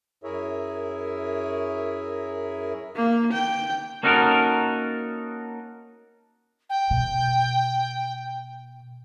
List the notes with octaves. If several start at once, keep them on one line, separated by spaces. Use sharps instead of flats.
F#2 E4 G#4 A#4 C#5 E5
A#3
G5
A#3 C#4 D#4 F#4 A4 A#4
G5
B2